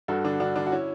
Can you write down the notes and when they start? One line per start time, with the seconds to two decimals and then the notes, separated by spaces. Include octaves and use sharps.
0.08 G2 F#4 A4
0.24 D3 D4
0.40 G2 D4 F#4
0.56 D3 D4
0.67 F#4
0.72 C#4 E4